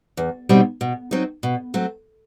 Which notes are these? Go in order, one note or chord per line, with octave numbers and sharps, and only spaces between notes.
E2
B2 G3 C4 D#4
B2
F#3 C4 D#4
B2
F#3 A3 C4